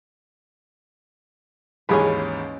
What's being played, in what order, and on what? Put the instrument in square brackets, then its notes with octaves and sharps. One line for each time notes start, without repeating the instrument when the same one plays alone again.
[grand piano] D#2 G#2 E3 [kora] C#4 G#4 B4